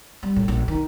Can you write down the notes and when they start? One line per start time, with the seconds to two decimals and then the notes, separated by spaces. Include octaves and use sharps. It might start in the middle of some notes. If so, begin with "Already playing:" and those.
0.23 G3
0.36 A2
0.48 A#1
0.68 D#3